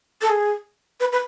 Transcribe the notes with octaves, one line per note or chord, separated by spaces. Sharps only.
A4
G#4
B4
B4